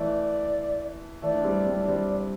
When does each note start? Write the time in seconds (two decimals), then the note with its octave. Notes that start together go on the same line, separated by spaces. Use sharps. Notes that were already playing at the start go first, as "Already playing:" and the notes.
Already playing: E3 A3 D5
1.22 E3 A3 D5
1.34 D4
1.44 G3 C4
1.66 G3 C4
1.81 D4
1.88 G3 C4